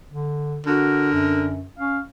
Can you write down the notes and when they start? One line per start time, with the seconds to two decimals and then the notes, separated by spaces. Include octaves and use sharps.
0.11 D3
0.66 D3 F#4 A#4
1.13 F#2
1.79 C#4 F5